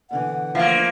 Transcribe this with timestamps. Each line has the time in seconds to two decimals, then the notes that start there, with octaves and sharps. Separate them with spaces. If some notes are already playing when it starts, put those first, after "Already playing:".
0.11 B2 D3 E3 F#5
0.55 F3 A3 A#3 F5